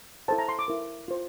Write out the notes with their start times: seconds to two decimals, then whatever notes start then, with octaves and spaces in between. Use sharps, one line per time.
0.28 E4 A4 C5 A5
0.38 A#5
0.49 C6
0.59 D6
0.68 E4 A#4
1.08 F4 C5